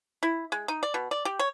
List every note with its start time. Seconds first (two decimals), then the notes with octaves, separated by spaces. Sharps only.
0.23 E4
0.52 G#3
0.68 D#4
0.83 D5
0.94 B2
1.11 D5
1.25 G4
1.39 C#5